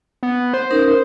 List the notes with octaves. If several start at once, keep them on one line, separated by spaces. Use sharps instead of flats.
B3
C5
C#4 D#4 A#4